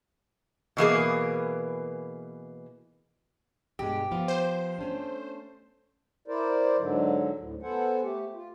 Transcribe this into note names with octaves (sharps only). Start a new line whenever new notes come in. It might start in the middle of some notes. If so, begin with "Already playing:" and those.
B2 E3 A#3 G#4
G2 B2 G#3 G4
F3 B3 F4
C5
A3 C#4 D4
E4 A#4 C5 D5
G#2 D3 F#3
D2 A2
B3 A4 C5 F#5 G#5
A3 G4
F4